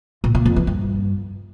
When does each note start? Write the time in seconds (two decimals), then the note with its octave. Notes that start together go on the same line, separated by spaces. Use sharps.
0.24 A#2
0.35 A#2
0.46 F2
0.56 E3
0.67 G2